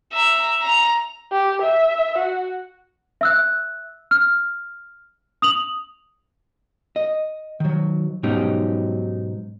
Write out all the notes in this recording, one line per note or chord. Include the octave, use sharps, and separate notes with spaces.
E5 A#5
A#5 F7
G4
E5
F#4
E5 E6 F#6
F6
D#6 F7 F#7
D#5
D#3 F#3
G#2 B2 F#3 C#4 D#4 G4